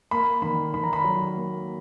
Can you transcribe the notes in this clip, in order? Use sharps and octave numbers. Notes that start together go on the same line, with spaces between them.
A#3 B5
D#3 B5
D#3 B5
A#5
B5
F#3
A#3